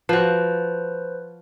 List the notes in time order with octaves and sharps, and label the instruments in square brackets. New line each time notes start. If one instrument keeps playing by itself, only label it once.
[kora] F3 F#4 [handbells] B4 C5